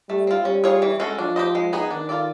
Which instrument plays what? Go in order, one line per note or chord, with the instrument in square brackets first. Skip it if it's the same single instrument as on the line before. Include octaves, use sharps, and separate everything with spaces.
[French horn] G3 [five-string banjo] A3
[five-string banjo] C4 F4
[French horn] G3 [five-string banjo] C#4
[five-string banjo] F4 G#4 C#5
E3
G#3 C#4 F#4 A4
[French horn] F3 [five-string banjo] D4
[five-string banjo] G4 C5 D#5
G#3
B3 D#4 G#4
[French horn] D#3 [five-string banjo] D4
[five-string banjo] F4 A4 D5